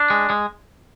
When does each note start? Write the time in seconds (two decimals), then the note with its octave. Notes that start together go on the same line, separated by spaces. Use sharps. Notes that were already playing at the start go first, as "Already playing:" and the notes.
Already playing: D4
0.10 G#3
0.30 G#3